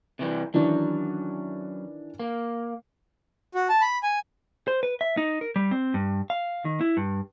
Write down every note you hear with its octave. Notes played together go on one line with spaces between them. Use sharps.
C3 E3 G3
D#3 E3 F#3 C#4 D4
A#3
F#4
A5
B5
G#5
C5
B4
E5
D#4
A#4
G3
C4
G2
F5
D#3
E4
G2